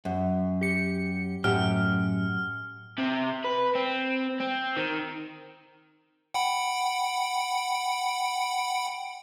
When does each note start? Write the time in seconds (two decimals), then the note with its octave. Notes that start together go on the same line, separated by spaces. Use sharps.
0.05 F#2
0.61 G4 C#7
1.44 F#2 A2 G4 F6
2.98 C3
3.45 B4
3.75 C4
4.40 C4
4.77 D#3
6.34 F#5 G5 B5